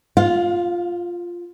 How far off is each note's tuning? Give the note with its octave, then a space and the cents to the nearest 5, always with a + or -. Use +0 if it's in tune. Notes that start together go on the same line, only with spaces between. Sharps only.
F4 +0 F5 +35